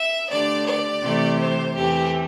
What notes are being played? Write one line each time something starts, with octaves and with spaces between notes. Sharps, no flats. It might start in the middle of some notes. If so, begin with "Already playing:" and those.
Already playing: E5
D3 A3 D4 G4 D5
D5
C3 E3 A3 C4 G4
C5
E2 E3 A3 C4 G4